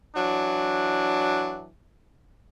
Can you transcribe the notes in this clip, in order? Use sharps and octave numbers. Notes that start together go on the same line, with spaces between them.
E3 F#3 D4